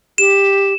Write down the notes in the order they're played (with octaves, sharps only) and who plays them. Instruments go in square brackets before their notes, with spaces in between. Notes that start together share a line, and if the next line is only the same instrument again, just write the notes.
[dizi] G4 [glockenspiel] E7